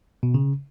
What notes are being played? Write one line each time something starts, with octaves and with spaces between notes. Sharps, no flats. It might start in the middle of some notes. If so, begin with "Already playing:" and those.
B2
C#3